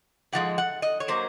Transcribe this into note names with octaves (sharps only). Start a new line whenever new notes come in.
G#2 F3 G#3 F#5
F#5
D#5
C#5
F#3 A#3 C5